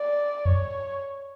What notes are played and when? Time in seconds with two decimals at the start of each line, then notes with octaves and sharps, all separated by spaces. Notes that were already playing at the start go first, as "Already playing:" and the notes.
Already playing: D5
0.45 F#2 C#5